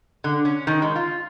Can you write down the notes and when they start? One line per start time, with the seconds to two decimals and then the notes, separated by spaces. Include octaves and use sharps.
0.24 D3
0.45 C#4
0.67 D#3
0.82 G#3
0.96 F4